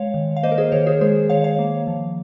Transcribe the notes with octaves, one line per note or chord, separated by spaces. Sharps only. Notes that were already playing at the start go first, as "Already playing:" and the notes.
Already playing: G#3 C#5 F5
D#3
F5
A#3 C5 D#5
A#4
G#4 C5
D#3 A#4 C#5
G#4 C5
G#3 G#4 C5
D#3 C#5 F5
C#5 F5
A#3
F3